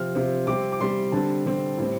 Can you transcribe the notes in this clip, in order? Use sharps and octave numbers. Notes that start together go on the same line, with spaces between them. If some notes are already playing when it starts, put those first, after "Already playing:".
Already playing: C3 F3 C4 F6
C3 F3 C4
C3 G3 C4 D6
D6
C3 G3 C4 C6
D3 G3 C4 A5
D3 G3 C4
A2 G3 C4